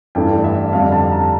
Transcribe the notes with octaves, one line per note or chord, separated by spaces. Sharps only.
G2 E3 A3 G5
D5
E5
F2 D3 G3 D4 F5
A5
A#5